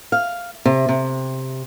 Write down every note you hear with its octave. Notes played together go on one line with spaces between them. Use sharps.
F5
C3
C3